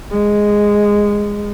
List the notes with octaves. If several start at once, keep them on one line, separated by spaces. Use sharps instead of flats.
G#3